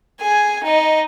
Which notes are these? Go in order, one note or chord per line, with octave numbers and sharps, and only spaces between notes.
G#4 G#5
D#4 D#5